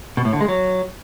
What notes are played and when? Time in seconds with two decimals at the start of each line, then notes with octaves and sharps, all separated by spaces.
0.17 B2
0.25 A2
0.33 D3
0.41 G#3
0.48 F#3